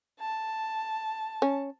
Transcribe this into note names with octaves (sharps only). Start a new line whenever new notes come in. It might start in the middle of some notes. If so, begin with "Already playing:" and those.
A5
C#4